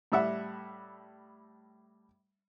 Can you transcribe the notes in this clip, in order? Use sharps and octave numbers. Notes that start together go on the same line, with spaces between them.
A2 G3 E5 F#5